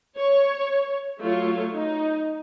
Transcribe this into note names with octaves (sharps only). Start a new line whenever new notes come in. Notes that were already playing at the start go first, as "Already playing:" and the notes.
C#5
F#3 A3 F4 C#5
D#4